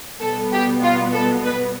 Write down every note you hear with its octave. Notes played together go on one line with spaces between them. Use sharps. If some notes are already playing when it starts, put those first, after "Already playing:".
B2 G3 B3 A4
G4
F4
A4
B4